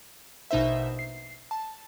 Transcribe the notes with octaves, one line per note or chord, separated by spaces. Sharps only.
A#1 B2 D#4 C5 E5
C7
A5